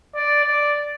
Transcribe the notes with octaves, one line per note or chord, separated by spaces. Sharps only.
D5
D5